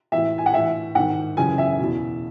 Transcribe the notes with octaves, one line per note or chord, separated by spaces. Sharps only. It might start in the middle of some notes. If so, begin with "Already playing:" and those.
A2 E3 E5
G#5
F#5
A2 E3 E5
G#2 D#3 F#5
F#2 C#3 E3 G#5
E5
E2 B2